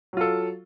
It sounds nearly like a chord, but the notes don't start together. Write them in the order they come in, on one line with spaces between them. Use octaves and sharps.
F#3 F4 A4